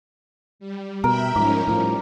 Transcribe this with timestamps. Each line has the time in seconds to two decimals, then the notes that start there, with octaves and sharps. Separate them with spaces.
0.59 G3
1.04 B2 A#4 E5 G5 B5
1.36 G#2 F3 C#4 D#4 A#4 D6
1.67 A2 E3 F3 G3